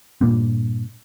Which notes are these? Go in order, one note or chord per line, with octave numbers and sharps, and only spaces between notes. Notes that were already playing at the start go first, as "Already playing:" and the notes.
G2 A#2 A#3 C4